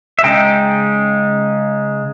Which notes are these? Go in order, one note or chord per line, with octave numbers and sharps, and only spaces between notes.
E5
C#3 G#3 D#4 G5